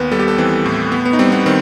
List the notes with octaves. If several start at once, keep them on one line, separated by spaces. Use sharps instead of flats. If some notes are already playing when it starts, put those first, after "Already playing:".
Already playing: D#2 B3 B4
G3 A4
G4
A4
E3 C4
A2
B3
B3
D#4
G3 C4
B3
D#3 C4